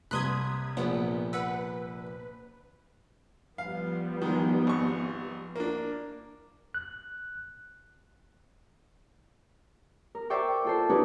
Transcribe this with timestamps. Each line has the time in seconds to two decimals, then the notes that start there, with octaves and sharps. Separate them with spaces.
0.11 C2 C3 B5 C6 D#6 F#6 G#6
0.77 A#1 B3
1.33 B4 F#5 E6
3.58 F3 G3 B3 F5
4.22 D#3 G#3
4.67 G#1 C#6
5.56 A#3 D4
6.74 F#6
10.15 A#4
10.30 C5 D5 E5 G5 C#6
10.65 F4 A4 C5
10.89 C#4 D#4 E4 G4 B4 C#5